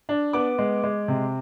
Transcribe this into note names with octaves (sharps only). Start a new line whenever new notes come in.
D4
B3 D6
G#3
G#3
C3